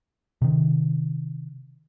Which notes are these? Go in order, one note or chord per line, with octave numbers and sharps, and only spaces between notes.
C3 D#3